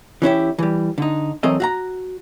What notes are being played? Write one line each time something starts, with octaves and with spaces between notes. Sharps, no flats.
E3 C#4 E4 G4
E3 G3
D3 D#4
E3 F#3 C4 A4 A#4 D#5
F#4 F5 A#5